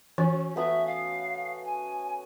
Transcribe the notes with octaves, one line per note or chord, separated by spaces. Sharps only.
E3 C#4 F#4
A3 B3 F#4 E5
F5
G#5